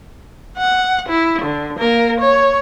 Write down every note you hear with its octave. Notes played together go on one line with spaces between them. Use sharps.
F#5
E4
D3
A#3 A#4
C#5